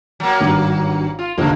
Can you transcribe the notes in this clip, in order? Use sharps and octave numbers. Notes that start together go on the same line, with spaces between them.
F#3 A#3
G#1 G2
F4
F1 A#1 D3 F3 A#3